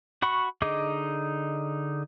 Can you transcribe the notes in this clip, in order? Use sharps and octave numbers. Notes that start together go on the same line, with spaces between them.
F#4 F#5 B5 C#6
D3 D#4 G#4 D#5 D6